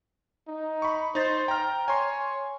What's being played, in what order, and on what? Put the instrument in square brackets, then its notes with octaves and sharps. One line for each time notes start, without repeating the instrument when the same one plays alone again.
[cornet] D#4
[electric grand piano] B5 C#6
[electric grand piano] D#4 A6 [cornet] C5
[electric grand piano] G5 F6 [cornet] A#5
[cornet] C#5 [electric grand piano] G#5 C6